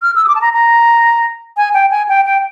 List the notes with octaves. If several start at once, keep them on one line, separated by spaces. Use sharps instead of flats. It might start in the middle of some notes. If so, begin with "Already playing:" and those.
F6
E6
D#6
D6
A5
A#5
A#5
G#5
G5
G#5
G5
G5